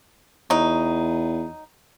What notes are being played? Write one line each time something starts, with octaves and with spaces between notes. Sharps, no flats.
E2 F#3 D#4